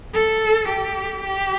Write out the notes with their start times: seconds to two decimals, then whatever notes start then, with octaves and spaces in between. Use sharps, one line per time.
0.15 A4
0.69 G4
1.24 G4